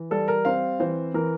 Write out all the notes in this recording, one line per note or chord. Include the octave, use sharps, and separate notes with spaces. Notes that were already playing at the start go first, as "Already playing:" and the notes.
Already playing: E3
G3 A4
A#4
C4 F5
E3 C5
E3 A#4